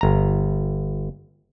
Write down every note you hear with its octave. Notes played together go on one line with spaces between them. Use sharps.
G1 A#5